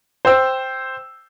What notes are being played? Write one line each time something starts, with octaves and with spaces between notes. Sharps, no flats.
C5 G5 E6